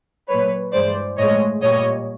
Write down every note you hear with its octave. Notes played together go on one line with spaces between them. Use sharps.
A#2 F#3 B4 C#5
G2 E3 G#3 C5 D5
A2 F3 G#3 C#5 D#5
A#2 G3 C#5 D#5